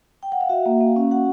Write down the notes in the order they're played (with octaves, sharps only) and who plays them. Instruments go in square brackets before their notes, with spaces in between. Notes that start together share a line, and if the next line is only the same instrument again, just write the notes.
[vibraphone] G5
F#5
F5
F#4 E5
A#3
A#3 F5
C#4
F#4 F#5